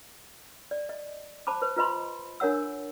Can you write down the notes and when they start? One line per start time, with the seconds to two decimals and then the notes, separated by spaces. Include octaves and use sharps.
0.71 D5
0.89 D#5
1.47 C5 A5 B5 D6
1.62 B4 C5
1.77 F4 B4 D#5 B5 C6
2.40 D4 A#4 C#5 F#5 E6